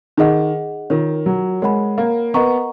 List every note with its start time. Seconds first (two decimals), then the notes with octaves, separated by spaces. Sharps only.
0.17 D#3 D#4 G#4 D#5 F#5
0.90 D#3 F4 A#4 C#5
1.26 F#3
1.62 G#3 A#4 C#5 F#5 B5
1.98 A#3
2.34 B3 A#4 D#5 F#5 A#5 C#6